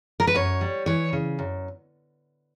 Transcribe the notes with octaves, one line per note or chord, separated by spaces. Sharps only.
A#4
B4
F#2 C#5
G3
E3 C#5
C#3
F#2